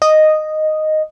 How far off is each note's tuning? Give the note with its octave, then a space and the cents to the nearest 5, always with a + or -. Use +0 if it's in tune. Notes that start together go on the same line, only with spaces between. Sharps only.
D#5 -5